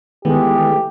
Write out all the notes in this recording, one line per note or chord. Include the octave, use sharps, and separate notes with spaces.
D#3 E3 G#3 A3 B3 G4